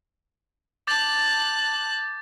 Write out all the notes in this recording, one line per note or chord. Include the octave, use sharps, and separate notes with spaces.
A5 D6 F#6 G6 A6